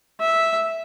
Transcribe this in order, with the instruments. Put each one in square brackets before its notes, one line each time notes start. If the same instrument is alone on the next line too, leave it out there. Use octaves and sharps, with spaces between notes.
[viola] E5